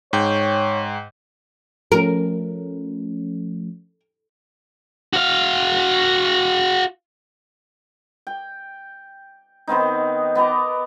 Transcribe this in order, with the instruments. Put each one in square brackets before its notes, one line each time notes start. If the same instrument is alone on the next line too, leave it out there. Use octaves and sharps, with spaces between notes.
[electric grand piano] G#2 G5 G6 [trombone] C#5
[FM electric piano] F3 A3 C#4 [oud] A#4
[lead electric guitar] F#4 F5
[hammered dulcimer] G5
D#3 B3 C4 D#4
B3 D#5 A#5 D6